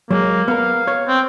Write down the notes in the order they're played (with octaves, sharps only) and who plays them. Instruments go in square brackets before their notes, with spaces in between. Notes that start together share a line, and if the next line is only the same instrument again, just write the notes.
[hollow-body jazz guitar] F#3 G#3 [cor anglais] A#3
[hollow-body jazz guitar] B3 A#4 [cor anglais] F5
[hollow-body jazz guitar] C#5
[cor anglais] C4